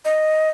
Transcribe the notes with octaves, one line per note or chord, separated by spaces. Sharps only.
D#5